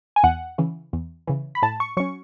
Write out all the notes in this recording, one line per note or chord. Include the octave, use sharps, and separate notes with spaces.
G#5
E2 F#5
C#3 E3
E2
C#3 E3
B5
A2 A5
C#6
F#3 C#4 C#6